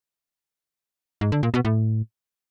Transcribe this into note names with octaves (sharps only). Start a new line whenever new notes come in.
G#2
D3
A#2
B2
A2